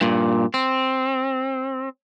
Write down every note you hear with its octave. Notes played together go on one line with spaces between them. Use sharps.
G2 A#2
C4